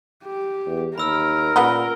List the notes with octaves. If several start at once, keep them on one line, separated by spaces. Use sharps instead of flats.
G4
E2
D#2 A#4 B5 E6 F6
A#2 C#3 B3 F#5 G7